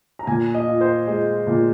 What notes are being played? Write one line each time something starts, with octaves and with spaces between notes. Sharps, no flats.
A#5
A#2 G#5
D#5
F4
C5
G#3 D#5
A#2